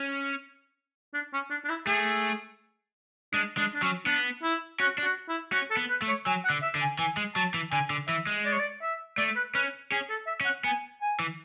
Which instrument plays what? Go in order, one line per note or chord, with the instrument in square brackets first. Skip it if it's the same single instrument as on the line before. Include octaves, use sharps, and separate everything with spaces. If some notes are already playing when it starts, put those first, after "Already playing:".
Already playing: [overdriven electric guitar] C#4
[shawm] D4
C#4
D4
D4
E4
[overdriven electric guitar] A3 [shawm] G#4
[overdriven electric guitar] G#3 [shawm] D4
[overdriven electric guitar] G#3 [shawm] D4
[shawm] D4
[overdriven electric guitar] F#3 [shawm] C#4
[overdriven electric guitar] B3 [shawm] D4
[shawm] E4
[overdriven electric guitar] C#4 [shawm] F#4
[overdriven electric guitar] D4
[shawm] F#4
E4
[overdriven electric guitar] C#4 [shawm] F#4
[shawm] A4
[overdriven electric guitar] B3
[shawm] B4
[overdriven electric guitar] A3
[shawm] C#5
[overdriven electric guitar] F#3 [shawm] G#5
[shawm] F#5
[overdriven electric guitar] D3
[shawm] E5
[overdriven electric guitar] D3
[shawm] G#5
[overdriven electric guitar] E3 [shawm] G#5
[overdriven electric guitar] G#3
[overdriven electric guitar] F#3 [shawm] A5
[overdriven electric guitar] E3
[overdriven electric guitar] D3 [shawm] G#5
[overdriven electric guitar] D3
[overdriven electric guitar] E3 [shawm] E5
[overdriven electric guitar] G#3
[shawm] D5
C#5
D5
E5
[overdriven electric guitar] A3 [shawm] D5
[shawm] B4
[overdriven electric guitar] C#4 [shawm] B4
[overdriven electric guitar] C#4 [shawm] G#4
[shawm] A4
E5
[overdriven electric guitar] C#4
[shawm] F#5
[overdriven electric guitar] B3 [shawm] G#5
[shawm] G#5
[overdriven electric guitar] E3